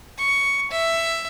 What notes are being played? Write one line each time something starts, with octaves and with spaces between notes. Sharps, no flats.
C#6
E5